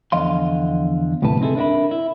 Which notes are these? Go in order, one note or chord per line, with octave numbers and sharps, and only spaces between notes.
E2 D3 F3 D#5 F5 C6
D2 A2 C3 G3 B4 A5
C4 D#4 E4 G#4 A4
D4 E4 A#4 D5 E5 B5
E4